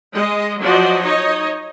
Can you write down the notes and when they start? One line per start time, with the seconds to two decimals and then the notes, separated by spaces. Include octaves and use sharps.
0.12 G#3 D#5
0.60 F3 F#3 F#4 D5 D#5
1.02 D#4 C#5 D#5